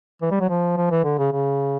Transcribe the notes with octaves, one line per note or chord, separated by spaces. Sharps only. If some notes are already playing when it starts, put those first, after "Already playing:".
E3
G3
F#3
F3
F3
E3
D3
C#3
C#3